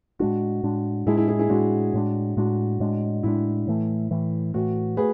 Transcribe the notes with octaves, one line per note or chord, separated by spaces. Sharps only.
A2 G#3 D4 F#4
A2 G#3 D4
A2 G#3 D4 E4 G#4
E4 G#4
E4 G#4
E4 G#4
A2 G#3 D4 F#4
A2 G#3 D4
A2 G#3 D4 F#4
A2 G#3 D4
A2 G#3 D4 E4
A2 E3 A3
A2 E3 A3
A2 E3 A3 F#4
A3 G#4 B4